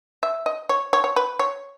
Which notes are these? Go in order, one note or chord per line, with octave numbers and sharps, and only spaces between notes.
E5
D#5
C#5
C#5
C#5
B4
C#5